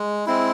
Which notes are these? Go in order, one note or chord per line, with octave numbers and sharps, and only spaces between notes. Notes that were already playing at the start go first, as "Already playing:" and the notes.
Already playing: G#3
G#3 C4 E4